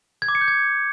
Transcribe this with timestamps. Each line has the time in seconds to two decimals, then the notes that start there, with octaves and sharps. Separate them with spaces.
0.22 G#6
0.28 D6
0.35 C#7
0.41 G6
0.48 G#6